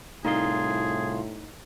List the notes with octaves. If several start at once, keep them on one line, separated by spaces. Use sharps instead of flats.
C2 A2 D#4 F4 G#4 C6